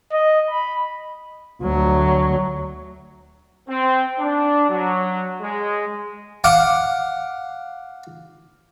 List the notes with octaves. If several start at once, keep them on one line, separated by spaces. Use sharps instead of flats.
D#5
B5
D2 F#3
C4
D4
F#3
G#3
F5 F#5 D6